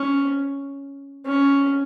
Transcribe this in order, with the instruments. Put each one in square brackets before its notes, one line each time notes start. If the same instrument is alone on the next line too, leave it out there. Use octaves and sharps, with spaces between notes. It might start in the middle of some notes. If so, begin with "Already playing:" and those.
Already playing: [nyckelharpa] C#4
C#4